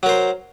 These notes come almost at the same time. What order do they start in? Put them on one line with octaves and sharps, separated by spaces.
F#3 A#4 C5